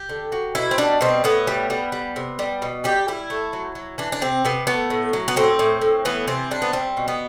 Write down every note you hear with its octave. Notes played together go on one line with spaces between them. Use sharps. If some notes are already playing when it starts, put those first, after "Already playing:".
Already playing: G4
D3
F#3
B2 E4
C4
G3 D4
B2 C4
A2 B3
G3
G3
G3
C3
G3
B2
G3 G4
G3 E4
A3
F#3
F#3
E3 D4
D4
C3 C4
C3 B3
A3 B3
A2
F#3
B3
A2 C4
A2
A2
E3 B3
C3 C4
G3 D4
B3
G3 C4
B2
B3